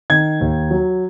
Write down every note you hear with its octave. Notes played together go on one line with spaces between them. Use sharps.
D#3 G#6
D#2
F#3